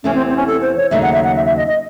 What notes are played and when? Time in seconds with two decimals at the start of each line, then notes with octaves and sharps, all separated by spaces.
0.04 E2 C3 E3 A3 C#4
0.15 C4
0.29 C4
0.36 C#4
0.47 A4
0.62 C5
0.77 C#5
0.91 D#2 C#3 F#3 A3 D#4 E5
1.03 F#5
1.13 E5
1.24 F#5
1.35 E5
1.45 E5
1.57 D#5
1.68 D#5